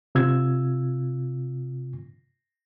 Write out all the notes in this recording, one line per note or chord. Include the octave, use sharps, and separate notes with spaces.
C3 F4 E6 G#6